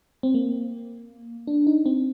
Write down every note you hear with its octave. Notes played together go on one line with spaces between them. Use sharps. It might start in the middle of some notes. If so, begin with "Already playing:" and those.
C4
A#3
D4
D#4
C4